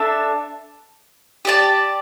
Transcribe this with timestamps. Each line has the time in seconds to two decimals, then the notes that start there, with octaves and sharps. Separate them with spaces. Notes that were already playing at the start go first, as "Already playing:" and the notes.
Already playing: D4 A4 E5 A5
1.45 G4 D5 A5